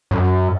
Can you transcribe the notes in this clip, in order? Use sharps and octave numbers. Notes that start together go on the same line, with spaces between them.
F#2